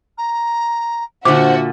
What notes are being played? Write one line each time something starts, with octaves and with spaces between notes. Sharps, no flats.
A#5
A#2 D3 F#4 C5 E5 D6